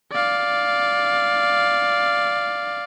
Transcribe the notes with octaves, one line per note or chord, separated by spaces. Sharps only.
D5 F5